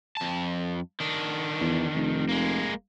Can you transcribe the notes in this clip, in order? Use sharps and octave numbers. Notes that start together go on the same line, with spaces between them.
F2 A5
D#3 D4
E2
F1
G#3 A#3